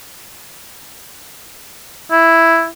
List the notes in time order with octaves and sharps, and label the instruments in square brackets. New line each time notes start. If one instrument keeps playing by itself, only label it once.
[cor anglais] E4